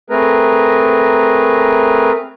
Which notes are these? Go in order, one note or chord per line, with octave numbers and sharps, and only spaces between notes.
A3 C4 G#4 A#4 B4 A#5